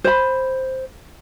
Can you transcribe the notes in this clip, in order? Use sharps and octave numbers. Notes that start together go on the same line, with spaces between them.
C5 B5